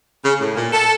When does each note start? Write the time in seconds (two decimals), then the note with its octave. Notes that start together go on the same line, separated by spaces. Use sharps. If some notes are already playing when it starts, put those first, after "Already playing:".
0.23 C#3
0.39 A2
0.56 A#2
0.72 A4